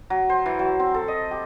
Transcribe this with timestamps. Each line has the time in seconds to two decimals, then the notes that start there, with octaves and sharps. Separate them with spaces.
0.10 F#3
0.30 C5
0.46 E3
0.59 F#3
0.80 C4
0.94 A4
1.08 D#5
1.31 G4